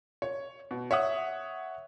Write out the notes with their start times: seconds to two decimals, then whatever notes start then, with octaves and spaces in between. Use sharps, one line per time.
0.22 C#5
0.71 B2
0.91 C#5 E5 F#5 D#6